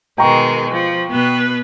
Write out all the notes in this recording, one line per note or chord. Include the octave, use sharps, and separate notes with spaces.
B2 D#3 G#3 G5 A#5 C#6
F3
B2 B3 B4